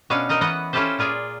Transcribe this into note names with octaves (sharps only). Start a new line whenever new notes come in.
B2 C#4 D4 F5
D#4 A#4 D#5
E3 B3 D#5 F#5
C#4 E4 F4 G4 A4 C5
A#2 F4 G#4 D5